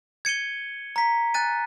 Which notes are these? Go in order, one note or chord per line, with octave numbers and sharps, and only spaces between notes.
G#6 C#7 D#7 G7
A#5 B6
G#5 F#6 A6 D#7